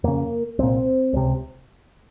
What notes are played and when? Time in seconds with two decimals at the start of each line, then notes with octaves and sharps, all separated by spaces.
0.04 F2 C#3 A#3
0.59 C2 A#2 C4
1.13 C#2 C3